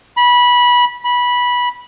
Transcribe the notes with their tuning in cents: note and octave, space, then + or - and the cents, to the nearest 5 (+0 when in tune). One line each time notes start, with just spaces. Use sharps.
B5 -20
B5 -15